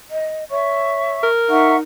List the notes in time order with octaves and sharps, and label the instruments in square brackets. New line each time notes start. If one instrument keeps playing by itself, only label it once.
[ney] D#5
[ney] C#5 [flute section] E5 C#6
[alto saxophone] A#4
[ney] D#4 [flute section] E5 F#5 C#6